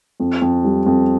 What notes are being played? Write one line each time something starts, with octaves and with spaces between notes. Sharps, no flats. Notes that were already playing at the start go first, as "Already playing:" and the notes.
F2
F2
G3
F2